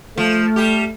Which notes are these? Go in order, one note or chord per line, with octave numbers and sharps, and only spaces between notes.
F3 A3
G3 G4